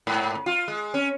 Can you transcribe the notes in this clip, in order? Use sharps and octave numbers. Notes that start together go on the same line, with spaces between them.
G#2
F4
G#3
C#4